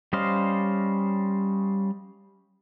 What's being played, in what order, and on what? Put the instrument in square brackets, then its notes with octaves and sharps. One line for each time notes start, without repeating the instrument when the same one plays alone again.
[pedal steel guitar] G3 C#4 C5 D#5 F5